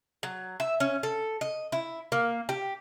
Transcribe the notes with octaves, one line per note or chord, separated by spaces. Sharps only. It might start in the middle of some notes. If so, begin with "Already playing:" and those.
F#3
E5
C#4
A4
D#5
E4
A#3
G4